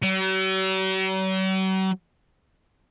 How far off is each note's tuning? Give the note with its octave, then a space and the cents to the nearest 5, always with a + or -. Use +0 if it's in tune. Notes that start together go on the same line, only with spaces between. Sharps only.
F#3 +45